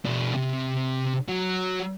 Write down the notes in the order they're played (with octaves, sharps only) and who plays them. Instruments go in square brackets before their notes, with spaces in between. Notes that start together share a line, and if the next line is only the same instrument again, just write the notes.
[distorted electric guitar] B2 D4
C3
F#3